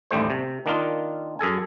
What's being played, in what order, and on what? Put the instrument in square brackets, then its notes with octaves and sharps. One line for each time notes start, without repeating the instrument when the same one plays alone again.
[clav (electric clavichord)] A1 D#2 G3 A3 C5
C3
D#3 A#3 D4 D#4 F4
F#2 G#4 A4 G#5